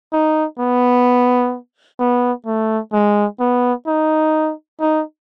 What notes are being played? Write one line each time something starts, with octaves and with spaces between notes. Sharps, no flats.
D#4
B3
B3
A3
G#3
B3
D#4
D#4